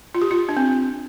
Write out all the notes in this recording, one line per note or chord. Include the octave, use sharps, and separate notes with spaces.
F4
G4
F4
D4
C4